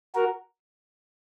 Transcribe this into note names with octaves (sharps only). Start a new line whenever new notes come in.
F#4 A#4